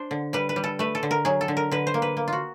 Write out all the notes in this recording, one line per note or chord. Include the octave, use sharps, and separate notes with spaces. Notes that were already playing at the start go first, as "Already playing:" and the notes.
Already playing: D4 C5
D3
G3 B4
B4
G3
A4
A3 B4
A4
D3
A#4
F#3 G#4
A4
D3
A#4
D3 B4
C5
A#3
B4
A#3
F4 F#4